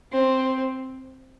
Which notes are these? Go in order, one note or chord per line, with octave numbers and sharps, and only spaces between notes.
C4